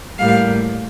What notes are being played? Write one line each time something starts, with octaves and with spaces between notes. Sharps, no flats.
A2 G3 A#3 F5